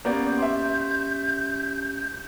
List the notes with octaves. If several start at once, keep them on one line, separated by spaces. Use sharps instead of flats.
A#3 B3 C#4 G4 D5 G6
E5 C6